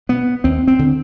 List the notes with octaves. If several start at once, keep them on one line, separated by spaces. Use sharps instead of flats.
B2 B3
D#2 C4
C4
D3